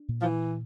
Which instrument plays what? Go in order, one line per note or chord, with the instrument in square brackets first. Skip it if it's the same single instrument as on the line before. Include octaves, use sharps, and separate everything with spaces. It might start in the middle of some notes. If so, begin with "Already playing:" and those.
Already playing: [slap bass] D4
A#2
[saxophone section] F3
E3